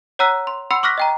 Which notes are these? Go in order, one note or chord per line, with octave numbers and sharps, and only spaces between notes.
C#5 F#5 A#5 E6 F#6 B6
C6
F#5 B5 C6 E6 C#7
C#6 D6 F6 F#6 A#6 B6
D#5 G5 A#5